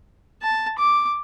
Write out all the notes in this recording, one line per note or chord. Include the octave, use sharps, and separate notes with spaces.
A5
D6